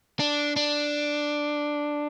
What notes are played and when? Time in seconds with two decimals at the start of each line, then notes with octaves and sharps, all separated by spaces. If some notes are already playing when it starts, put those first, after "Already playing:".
0.20 D4
0.56 D4